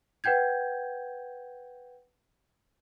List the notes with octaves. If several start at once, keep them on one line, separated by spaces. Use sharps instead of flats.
B4 F#5 G5 G6 G#6